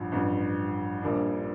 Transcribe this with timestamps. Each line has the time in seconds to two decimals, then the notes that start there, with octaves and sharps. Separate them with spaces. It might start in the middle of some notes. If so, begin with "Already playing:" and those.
Already playing: A1 G2 F3
0.12 A1 G2 F3
1.01 A#1 A#2 G3 D4